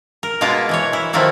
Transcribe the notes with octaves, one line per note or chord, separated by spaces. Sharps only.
A#4
B2 G#3 A#3 F4 A5
E3 A#4 C#5
E4
D#3 F3 F#3 A3 A#3 E4